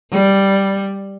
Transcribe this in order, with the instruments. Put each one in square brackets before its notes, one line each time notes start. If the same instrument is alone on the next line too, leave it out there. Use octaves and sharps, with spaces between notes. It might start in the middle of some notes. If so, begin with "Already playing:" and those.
[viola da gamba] G3